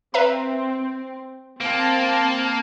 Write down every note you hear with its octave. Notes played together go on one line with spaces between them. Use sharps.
C4 B4 E5 A#5
A#3 C4 A5